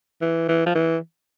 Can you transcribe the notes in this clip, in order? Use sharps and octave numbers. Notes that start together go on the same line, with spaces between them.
E3
E3
F3
E3